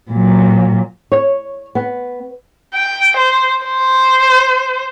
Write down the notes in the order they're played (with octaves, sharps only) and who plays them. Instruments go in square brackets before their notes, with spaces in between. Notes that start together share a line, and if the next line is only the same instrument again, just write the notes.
[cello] A#2 F#3
[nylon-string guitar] C#5
B3
[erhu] G5
C5
C5